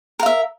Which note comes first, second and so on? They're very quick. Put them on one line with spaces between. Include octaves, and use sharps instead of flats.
A#4 F5 E5